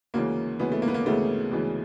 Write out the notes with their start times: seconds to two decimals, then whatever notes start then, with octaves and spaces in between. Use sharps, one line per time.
0.14 D2 C#3 E3 G#3 A#3
0.60 D2 C#3 E3 G#3 B3
0.72 A3
0.82 A#3
0.88 B3
0.94 A#3
1.06 D2 C#3 E3 G#3 A3
1.51 D2 C#3 E3 G#3